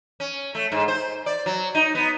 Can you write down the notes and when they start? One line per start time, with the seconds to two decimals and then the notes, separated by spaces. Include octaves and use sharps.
0.20 C#4
0.55 A3
0.72 G#2
0.88 C5
1.26 D5
1.46 F#3
1.75 D#4
1.95 B3